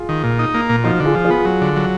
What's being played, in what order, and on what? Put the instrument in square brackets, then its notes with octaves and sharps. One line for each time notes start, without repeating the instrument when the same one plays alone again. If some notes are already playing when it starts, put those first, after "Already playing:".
Already playing: [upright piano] F4 G#4
[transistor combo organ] D#3
A#2
D#4
A#3
A#2
[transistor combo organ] F3 [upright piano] D#4 F#4
[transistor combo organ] D3
[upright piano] F4 G#4
[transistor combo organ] F3
[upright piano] F4 G#4
[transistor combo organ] B3
F#3
D3
F#3